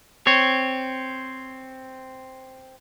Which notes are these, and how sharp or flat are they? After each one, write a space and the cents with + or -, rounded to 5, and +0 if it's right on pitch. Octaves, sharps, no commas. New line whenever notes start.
C4 +0 C#5 +0